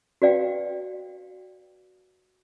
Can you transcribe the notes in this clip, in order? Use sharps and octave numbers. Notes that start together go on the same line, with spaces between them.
F#4 B4 D5 F5 G5